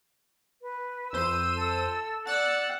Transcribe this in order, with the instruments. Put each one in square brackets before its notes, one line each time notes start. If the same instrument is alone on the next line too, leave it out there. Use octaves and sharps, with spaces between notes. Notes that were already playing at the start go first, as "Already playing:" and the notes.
[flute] B4
[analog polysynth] F2 C5 D#7 [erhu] E6
[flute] A4
[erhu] D5 [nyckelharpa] F#5 [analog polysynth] E6 F#6 A6